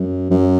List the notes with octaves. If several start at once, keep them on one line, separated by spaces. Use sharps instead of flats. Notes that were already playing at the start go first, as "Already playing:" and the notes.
Already playing: F#2
F#2